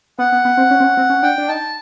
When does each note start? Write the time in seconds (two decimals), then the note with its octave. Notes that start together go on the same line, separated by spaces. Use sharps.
0.19 B3 F#5
0.32 B3
0.45 B3
0.57 C4
0.71 C#4
0.80 C4
0.84 C#4
0.97 C4
1.10 C#4
1.23 D4 G5
1.38 D4
1.49 D#4 A5